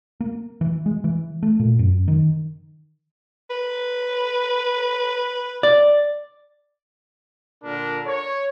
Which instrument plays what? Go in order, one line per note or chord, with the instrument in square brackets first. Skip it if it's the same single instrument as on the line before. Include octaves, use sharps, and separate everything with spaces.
[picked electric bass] A#3
E3
G#3
E3
A3
A#2
F#2
D#3
[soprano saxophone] B4
[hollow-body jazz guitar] D5
[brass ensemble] A#2 D3 D4 A#4
C#5